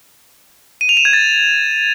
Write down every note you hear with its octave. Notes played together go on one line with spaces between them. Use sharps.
D#7
F7
E7
G#6
A6